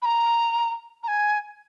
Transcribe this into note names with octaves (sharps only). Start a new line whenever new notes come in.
B5
A#5
A#5
G#5